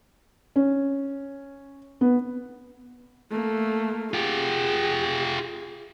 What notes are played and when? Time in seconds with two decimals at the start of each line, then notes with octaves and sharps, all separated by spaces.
0.56 C#4
2.01 B3
3.30 A3 A#3
4.13 F4 G4 G#4